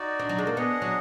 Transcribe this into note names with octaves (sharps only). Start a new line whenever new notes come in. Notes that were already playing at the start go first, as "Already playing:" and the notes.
Already playing: D#4 F#4 D5
D4
F#3
G#3
A#3
B3 D4 G#4 D#5 F#5
F#3